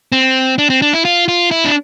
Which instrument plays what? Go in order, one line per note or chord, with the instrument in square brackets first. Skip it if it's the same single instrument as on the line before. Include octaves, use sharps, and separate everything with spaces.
[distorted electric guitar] C4
D4
C4
D4
E4
F4
F4
E4
D4